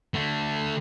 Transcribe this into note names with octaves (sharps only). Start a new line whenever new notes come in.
D3 A3